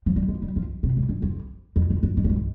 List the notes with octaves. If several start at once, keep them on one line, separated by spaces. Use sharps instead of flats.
F3
G3
G#3
G3
F3
C3
G#2
G2
F2
F2
F2
G2
G#2
G2
G#2